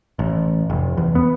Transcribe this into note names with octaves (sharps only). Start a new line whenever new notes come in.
A1
F1
E2
B3